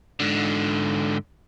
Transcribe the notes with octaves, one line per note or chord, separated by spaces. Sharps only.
G#2 D3